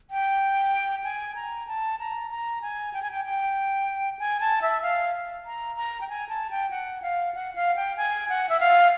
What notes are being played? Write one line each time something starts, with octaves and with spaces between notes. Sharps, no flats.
G5
G#5
A#5
A5
A#5
A#5
G#5
G5
G#5
G5
G5
G#5
A5
E5
F5
A#5
A#5
G5
G#5
A5
G5
F#5
F5
F#5
F5
G5
G#5
F#5
E5
F5